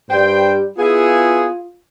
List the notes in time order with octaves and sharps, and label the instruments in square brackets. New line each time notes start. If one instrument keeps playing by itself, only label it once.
[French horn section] G2 G3 [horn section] C5 G5
[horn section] B3 E4 G#4 [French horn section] F4